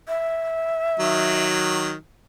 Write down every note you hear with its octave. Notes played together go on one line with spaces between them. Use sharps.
E5
D#3 F#3